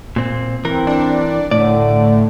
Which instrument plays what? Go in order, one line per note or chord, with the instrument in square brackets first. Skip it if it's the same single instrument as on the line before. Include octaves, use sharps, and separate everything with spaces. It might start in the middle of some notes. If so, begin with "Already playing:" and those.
[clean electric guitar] A#2 C4
[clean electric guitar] E3 A#4 [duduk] C4
[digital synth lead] D4
[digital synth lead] A2 [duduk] D3 [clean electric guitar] D5